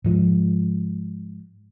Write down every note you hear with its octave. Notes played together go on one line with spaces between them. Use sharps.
G#2 F3 G#3